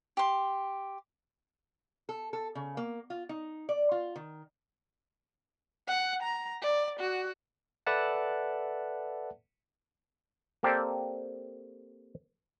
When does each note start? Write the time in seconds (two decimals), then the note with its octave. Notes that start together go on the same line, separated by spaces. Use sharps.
0.17 G4 C6
2.09 A4
2.33 A4
2.55 C#3
2.77 A#3
3.10 F4
3.29 D#4
3.69 D5
3.91 F4
4.16 D#3
5.88 F#5
6.23 A#5
6.62 D5
7.00 F#4
7.86 A4 B4 D5 E5 F#5 A5
10.63 A#3 C4 G4 A4 C5 D5